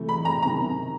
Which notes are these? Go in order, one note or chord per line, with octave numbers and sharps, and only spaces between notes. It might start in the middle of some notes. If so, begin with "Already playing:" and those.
Already playing: C3 E3 A3
B5
A#5
C3 D#3 A#5